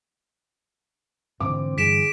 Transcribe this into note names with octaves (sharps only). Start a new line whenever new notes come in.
G#2 D3 E3 C4 D6
G2 D3 E3 G#4 B6 D7 E7